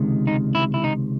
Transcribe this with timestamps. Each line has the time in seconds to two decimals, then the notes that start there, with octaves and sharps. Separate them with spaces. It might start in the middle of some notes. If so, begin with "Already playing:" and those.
Already playing: C#2 C3 D#3 G#3
0.27 D#4
0.55 E4
0.74 E4
0.84 D#4